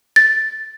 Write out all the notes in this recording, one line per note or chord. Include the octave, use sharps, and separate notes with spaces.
A6